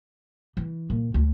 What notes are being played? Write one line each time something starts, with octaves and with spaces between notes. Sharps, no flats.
E3
A#2
D2